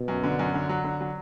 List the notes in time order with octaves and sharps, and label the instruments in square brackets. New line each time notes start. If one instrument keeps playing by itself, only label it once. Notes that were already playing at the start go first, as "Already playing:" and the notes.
Already playing: [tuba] B2
[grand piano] F#2
D3
F#2
D3
F#3
D3
F#3